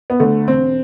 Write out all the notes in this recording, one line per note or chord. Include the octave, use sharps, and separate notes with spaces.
B3
D2 D3 A3
E1 C4